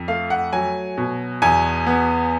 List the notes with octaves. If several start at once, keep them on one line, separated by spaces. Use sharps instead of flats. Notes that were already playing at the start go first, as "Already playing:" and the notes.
Already playing: F2
A3 F5
F#5
F#3 G#5
B2
E2 G#5
B3